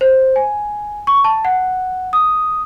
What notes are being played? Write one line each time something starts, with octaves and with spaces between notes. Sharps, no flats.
C5
G#5
C#6
A5
F#5
D#6